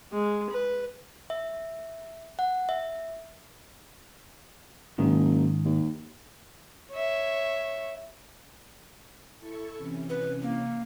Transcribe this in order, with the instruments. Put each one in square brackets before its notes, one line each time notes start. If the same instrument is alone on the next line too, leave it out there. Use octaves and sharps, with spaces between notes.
[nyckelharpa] G#3
B4
[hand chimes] E5
F#5
E5
[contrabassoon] F#1 [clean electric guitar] G#2 D#3
[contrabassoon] D#2
[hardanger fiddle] C#5 E5
[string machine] E4 A4 C#6
C3 E3 C#4
[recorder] B4
A#3